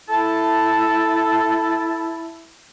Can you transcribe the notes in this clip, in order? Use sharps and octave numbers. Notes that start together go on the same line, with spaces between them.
E4 A4 A5